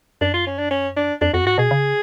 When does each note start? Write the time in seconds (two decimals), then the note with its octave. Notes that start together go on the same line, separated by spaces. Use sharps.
0.21 F#2 D4
0.33 F4
0.46 C#4
0.58 D4
0.71 C#4
0.96 D4
1.21 F2 D4
1.34 F2 F#4
1.42 F#2
1.46 G#2 F#4
1.58 B2 G#4
1.71 C#3